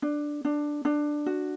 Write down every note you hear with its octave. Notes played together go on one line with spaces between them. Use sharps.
D4
D4
D4
F#4